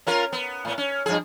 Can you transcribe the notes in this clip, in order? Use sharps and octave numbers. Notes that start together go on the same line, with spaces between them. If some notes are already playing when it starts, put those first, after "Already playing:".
C#4 F4 A#4
B3
A2 B3
C#4
G2 F3 G#4